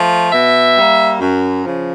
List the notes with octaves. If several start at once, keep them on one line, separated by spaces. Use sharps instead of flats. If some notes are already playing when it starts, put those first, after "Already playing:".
Already playing: F3 A3
B2 E5
G3 A#3
F#2
C#3 F3